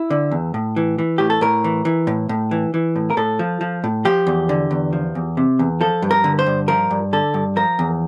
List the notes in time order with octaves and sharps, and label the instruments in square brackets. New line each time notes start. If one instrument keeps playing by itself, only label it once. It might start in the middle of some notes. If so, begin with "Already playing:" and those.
Already playing: [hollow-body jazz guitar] E4
D3
E2
A2
E3
E3
A2 G4
A4
A2 A#4
E3
E3
A2
A2
E3
E3
A2
A#4
A2 A4
F3
F3
A2
F3 G4
E2
D3
E2
F3
E2
C3
E2
F3 A4
G2
A#4
D3
C5
G2
F3 A#4
G2
D3 A4
G2
F3 A#4
E2